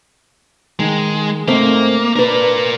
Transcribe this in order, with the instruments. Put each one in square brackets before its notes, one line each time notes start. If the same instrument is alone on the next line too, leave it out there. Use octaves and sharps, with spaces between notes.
[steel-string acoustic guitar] D#3 [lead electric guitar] G#3
[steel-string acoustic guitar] G#2 A3 C4 [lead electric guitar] A#3
[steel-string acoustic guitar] D4 B4 [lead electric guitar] A#4 D5